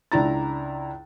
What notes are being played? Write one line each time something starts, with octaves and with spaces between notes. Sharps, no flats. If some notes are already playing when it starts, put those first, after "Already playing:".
C#2 D4 E4 A#5 A6